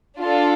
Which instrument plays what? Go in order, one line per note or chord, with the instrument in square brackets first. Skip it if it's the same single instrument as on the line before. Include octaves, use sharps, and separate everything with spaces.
[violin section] D4 F4 A4